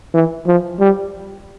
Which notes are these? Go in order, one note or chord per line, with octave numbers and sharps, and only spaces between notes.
E3
F3
G3